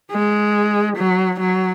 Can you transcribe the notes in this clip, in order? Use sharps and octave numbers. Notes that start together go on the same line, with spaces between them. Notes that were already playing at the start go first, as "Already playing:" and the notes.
G#3
F#3
F#3